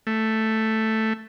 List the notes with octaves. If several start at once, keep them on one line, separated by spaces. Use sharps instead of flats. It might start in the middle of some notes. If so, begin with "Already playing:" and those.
A3